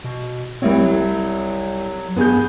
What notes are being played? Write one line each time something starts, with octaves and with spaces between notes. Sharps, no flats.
B2
C2 C4 E4 C#5
F#3
G2 B3 G#4 G6